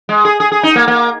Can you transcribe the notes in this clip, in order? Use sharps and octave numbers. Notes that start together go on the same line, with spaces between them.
G#3
G#4
G#4
G#4
D#4
A#3
A#3